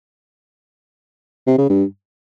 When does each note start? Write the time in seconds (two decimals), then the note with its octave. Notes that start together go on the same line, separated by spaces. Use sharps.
1.47 C3
1.58 C#3
1.69 G2